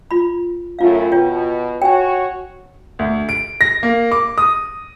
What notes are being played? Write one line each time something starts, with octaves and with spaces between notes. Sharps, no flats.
F4 B5
F#2 A2 F4 F5
B2 F4 C#5 G5
F#4 C#5 G5 G#5
D2
D7
A#6
A#3
D6
D#6